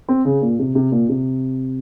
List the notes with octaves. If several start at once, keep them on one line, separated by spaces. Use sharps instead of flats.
C4
C#3
A#2
C3
C3
A#2
C3